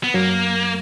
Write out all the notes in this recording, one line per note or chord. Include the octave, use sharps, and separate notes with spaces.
B3
F#2 F#3 A#3